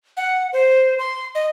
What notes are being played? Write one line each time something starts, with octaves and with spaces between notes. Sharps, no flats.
F#5
C5
C6
D#5